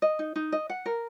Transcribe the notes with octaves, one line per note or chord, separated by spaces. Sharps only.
D#5
D#4
D#4
D#5
F#5
A#4